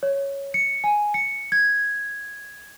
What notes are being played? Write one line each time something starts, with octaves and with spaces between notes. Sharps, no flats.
C#5
C#7
G#5
C#7
G#6